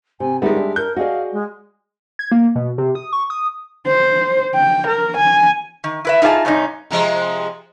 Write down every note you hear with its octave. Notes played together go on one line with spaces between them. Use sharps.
C3 G#5
D#3 G3 G#3 B3 E5
D4
A#4 G6
F#4 G#4 D5 D#5 F5
G#3
G#6
A#3
B2
C3
D#6
C#6
D#6
C5
G5
A#4
G#5
D#3
E4 B4 E5
D#4 F4 G#4 C#5 A5
G2 C3 C#4 D#4
C3 F3 G#3